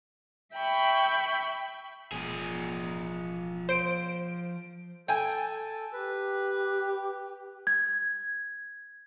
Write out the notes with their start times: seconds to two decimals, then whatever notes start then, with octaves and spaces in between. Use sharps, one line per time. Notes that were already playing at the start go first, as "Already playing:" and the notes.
0.55 E5 G5 B5 C#6
2.12 E1 F3 G#4
3.69 C5 D7
5.08 A4 G5 G#5
5.93 G4 B4
7.67 G#6